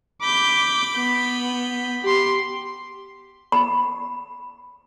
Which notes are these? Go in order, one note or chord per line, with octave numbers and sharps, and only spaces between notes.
B5 D6 G6
B3 G6
G4 C6
B5